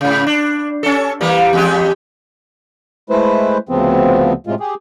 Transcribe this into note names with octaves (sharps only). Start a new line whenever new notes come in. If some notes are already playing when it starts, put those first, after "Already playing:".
G#2 C#3
D4
C#4 A4
E3 G3 A#3
E2 G#3 G4
G#3 A3 E4 B4 C5
D2 C#3 F3 B3 C4
A2 C3 G#3 F4
G4 G#4